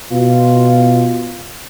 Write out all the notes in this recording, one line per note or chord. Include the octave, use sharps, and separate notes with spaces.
B2 F4